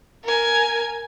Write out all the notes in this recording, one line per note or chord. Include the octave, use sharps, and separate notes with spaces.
A#4 G#5